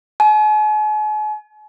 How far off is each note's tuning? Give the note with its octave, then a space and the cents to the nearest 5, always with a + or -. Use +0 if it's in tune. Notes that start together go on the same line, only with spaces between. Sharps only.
G#5 +45